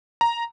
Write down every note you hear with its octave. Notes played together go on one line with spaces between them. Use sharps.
A#5